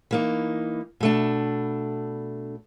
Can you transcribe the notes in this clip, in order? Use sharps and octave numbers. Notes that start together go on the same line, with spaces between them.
E3 A#3 D#4
B2 A3 D4